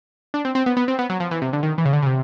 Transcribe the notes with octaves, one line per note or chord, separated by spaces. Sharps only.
D4
C4
C4
B3
B3
C4
B3
F#3
F3
E3
C3
D3
D#3
E3
C#3
D3
C#3
C3